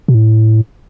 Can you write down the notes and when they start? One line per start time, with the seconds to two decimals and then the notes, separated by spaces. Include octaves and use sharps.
0.08 B2
0.14 A2